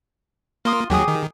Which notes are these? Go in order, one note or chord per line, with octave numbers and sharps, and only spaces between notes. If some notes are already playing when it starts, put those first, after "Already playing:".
A#3 F4 C6 D#6
D#2 F#3 G4 G#4 D#6
D#3